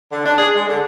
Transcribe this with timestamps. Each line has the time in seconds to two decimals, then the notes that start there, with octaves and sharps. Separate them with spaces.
0.12 D3
0.26 D4
0.38 G#4
0.55 G#3
0.69 D3